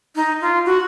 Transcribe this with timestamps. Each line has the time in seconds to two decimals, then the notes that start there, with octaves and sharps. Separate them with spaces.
0.16 D#4
0.41 F4
0.66 F#4